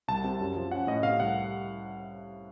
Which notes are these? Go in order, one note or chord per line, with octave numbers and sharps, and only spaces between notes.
C2 A5
C3
F#2
F3
C#4 F#5
A2 D#5
C3 F5
C2 F#5